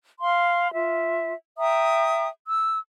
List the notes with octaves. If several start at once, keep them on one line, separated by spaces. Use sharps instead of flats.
F5 C6
F4 E5
E5 G5 A#5 D#6
E6